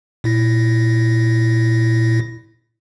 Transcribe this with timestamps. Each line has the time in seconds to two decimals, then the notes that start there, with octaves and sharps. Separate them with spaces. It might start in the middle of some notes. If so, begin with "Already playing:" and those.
0.24 A#2 E4 A#6